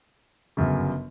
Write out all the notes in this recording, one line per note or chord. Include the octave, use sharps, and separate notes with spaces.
G1 F#2 C#3